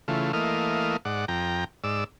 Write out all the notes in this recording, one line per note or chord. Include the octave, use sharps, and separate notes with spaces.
C#3 E3 A3 F4
E3 A3 A#3 D#5 F5
G#2 D5 F#5
F2 G5 A#5
G#2 D5 E6